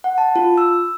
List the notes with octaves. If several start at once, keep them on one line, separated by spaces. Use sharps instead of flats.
F#5
A5
F4
E6